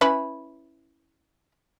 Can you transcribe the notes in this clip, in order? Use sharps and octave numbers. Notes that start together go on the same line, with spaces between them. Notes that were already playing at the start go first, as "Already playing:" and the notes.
C#4 E4 B4